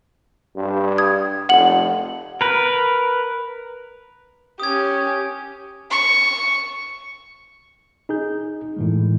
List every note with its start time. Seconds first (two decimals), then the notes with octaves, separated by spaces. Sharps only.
0.56 G2
0.98 D#6 G#6
1.49 F1 F#5 F#7
2.41 A#4 B4
4.60 C#4 G4 D#6 G#6
5.91 C#6
8.09 D#4 G#4 G6
8.77 A2 E3 G#3